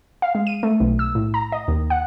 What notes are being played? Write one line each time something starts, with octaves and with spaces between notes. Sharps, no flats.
F5
G#3
D#7
A3
B1
E6
A2
A#5
D#5
D#2
F#5